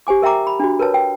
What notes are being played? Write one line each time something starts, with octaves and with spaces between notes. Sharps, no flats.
G4 C5 G#5 D6
A#4 E5 G5 A#5 D6
B5
D4 F#4
A#4 B4 C#5 A5
G5